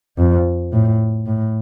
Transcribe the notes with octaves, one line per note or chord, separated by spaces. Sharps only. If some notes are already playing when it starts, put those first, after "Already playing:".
F2
A2
A2